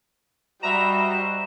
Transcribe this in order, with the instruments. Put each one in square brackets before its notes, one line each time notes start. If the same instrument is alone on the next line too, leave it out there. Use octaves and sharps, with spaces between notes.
[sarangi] G3 [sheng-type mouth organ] F#4 C5 D#5 [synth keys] E5 A#5 [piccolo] E7